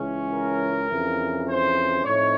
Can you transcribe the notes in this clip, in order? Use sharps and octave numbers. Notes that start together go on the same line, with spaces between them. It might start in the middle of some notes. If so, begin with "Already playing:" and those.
Already playing: C#2 C#3 E3 G#3 C#4
A#4
F2 C#3 E3
C5
A2 F3 A3 C4 D#4 C#5